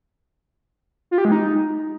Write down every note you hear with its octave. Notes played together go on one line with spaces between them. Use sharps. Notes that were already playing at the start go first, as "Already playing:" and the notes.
F4
G4
G#3
D#4